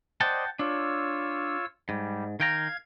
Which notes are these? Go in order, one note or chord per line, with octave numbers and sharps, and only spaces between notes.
C5 D5 D#5 F#5 G5 A5
D4 F4 C#5 E6
G#2 G3
D#3 F5 G5 A#5 G#6